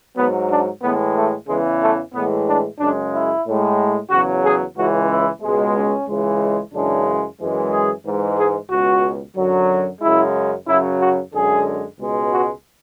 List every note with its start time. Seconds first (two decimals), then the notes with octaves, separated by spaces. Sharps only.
0.16 G#2 F#3 B3
0.49 D4
0.82 A2 E3 G#3 B3
1.15 A3
1.48 E2 C#3 E3 G#3
1.81 A3
2.14 A2 E3 G#3 B3
2.47 D4
2.79 F#2 C#3 G#3 D4
3.12 E4
3.45 A2 G#3
4.10 E2 C#3 F#3 F#4
4.43 G#4
4.76 C#2 C#3 E3 G#3 F#4
5.10 E4
5.42 C#2 B2 G#3
5.75 C#4
6.08 C#2 C#3 E3 G#3
6.73 F#2 C#3 E3 G#3 D4
7.40 F#2 E3 G#3
7.72 G#4
8.05 G#2 E3 G#3
8.37 G#4
8.70 C#2 B2 G#3 F#4
9.36 F#2 D3 F#3
10.02 F#2 C#3 G#3 E4
10.67 F#2 C#3 F#3 E4
11.00 F#4
11.33 F#2 D3 G#3 G#4
11.99 C#2 B2 G#3
12.32 F#4